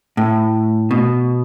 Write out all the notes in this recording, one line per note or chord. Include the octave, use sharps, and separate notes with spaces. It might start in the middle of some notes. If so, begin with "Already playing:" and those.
A2
B2